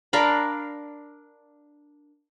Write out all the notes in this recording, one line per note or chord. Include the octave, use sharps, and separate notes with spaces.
D4 A#4 F5 B5